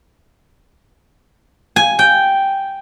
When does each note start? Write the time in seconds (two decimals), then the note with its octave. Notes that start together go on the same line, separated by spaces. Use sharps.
1.76 G#5
1.99 G5